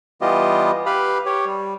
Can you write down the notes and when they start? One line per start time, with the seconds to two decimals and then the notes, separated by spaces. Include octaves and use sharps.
0.22 E3 G3 B3 F4 G4 D#5
0.86 G4 B4 F5 B5
1.26 G4 C#5
1.46 G3